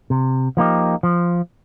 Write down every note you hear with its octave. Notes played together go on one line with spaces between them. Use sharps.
C3
F3 A#3 D#4 G4
F3